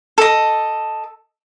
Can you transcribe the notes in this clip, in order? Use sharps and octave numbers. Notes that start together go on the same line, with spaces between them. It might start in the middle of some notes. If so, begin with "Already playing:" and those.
A4 D#5